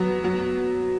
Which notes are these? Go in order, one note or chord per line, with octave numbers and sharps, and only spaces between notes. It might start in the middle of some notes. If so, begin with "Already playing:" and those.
Already playing: F#3 B3
F#3